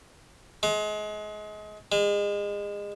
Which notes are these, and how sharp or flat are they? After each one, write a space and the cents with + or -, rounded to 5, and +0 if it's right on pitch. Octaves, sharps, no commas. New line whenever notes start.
G#3 +30
G#3 -30